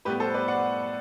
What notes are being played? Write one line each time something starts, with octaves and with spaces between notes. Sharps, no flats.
A2 G3 B3 G4 B4
A4 C5
B4 D5
D5 F#5